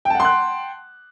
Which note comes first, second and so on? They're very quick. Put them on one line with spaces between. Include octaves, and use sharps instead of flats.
G5 A5 F#5 C6 F#6